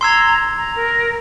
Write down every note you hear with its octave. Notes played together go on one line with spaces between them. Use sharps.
A#5 C6 E6 G#6
A#5
A#4